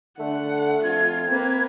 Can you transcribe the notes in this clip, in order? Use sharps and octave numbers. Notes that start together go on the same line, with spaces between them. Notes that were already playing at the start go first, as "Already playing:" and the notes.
D3 A3 F#5
F2 F4 G#6
A#3 C4 B4